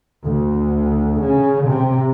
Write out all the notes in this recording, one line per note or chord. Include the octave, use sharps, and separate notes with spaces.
D2
C#3
C3